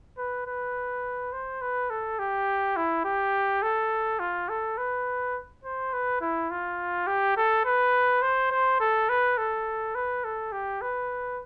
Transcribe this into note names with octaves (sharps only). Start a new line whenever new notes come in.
B4
B4
C5
B4
A4
G4
E4
G4
A4
F4
A4
B4
C5
B4
E4
F4
G4
A4
B4
C5
C5
A4
B4
A4
B4
A4
G4
B4